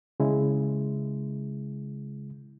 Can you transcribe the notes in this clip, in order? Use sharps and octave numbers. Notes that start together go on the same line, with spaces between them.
C#3 G#3 E4